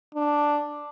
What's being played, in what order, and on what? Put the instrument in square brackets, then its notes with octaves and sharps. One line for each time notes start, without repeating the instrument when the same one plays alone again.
[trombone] D4